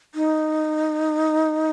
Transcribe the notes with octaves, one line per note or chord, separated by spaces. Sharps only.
D#4